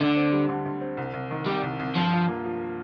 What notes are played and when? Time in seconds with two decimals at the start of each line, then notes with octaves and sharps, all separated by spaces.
0.01 D2 D3
0.16 C4
0.32 G3
0.49 D3
0.66 D2
0.81 C4
0.97 C2
1.14 C2
1.31 D#3
1.46 C3 G3
1.63 C2
1.79 C2
1.95 G2 F3
2.12 F4
2.28 A#3
2.45 F3